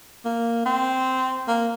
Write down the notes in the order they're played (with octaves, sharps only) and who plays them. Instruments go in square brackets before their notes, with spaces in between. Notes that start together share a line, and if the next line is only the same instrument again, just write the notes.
[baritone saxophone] A#3
C4
A#3